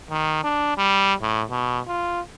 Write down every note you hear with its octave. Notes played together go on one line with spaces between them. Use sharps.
D#3
D4
G3
A2
B2
F4